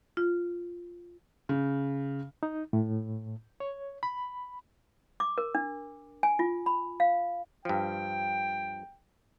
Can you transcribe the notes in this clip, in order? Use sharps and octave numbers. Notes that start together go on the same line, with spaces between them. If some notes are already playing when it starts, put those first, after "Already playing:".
F4
C#3
D#4
A2
C#5
B5
D6
A#4
D4
G#5
F4
B5
F5
G2 F3 G5